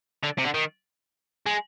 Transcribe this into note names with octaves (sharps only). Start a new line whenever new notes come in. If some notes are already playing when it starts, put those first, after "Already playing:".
D3
C3
D3
D#3
G#3